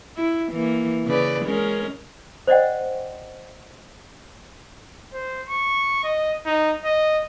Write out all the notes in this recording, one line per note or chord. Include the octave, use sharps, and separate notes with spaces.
E4
E3 A#3
C#3 B4 D5
G#3 C#4 A#4
C5 D5 D#5 F#5 G5
C5
C#6
D#5
D#4
D#5